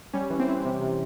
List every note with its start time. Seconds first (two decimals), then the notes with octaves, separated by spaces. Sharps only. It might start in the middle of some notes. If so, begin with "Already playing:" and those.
0.14 G3 C#4
0.30 E3
0.39 C4
0.48 E3
0.65 C3
0.81 C3